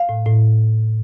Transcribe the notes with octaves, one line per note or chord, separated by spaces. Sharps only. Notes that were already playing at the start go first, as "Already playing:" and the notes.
Already playing: F5
A2
A2